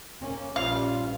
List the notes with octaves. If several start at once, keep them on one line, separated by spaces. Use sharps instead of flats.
A#3 C#4
A#1 G2 G3 C#4 F4 F5